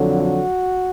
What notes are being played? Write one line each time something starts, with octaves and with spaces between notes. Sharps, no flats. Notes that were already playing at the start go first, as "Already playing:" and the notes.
Already playing: F2 D3 F#3
F#4